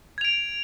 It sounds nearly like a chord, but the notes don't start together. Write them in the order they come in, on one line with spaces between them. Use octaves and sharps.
G#6 F7 D7